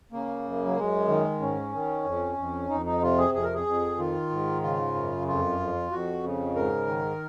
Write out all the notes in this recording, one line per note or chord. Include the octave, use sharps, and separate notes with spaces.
C#3 A#3
F#2
F#3
F#2 G#3
D#3
G#2 C#4
D#3
F2
F2
F2 D#4
D#4
C3 F4
G#4
F2 G#4
A#4
G#4
F2
D#3 F4
G#2
C#3 F4
F#2
F2 F4
F2
F2 F#4
C#3
G#2 A#4
D#3